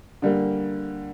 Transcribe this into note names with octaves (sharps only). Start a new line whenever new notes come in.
D3 G3 A#3